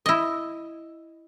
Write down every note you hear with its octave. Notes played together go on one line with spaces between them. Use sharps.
E4 D#5